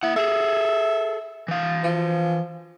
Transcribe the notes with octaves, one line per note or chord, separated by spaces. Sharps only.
A#3 E4 F#5
G#4 A4 E5
E3 F5
F3